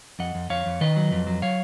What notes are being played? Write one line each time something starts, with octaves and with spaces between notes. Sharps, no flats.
F2 D#5 F#5
F2
F2 C#5 F5
F2
D#3 B4 D#5
F#3
F2
F#3
F#3 C#5 F5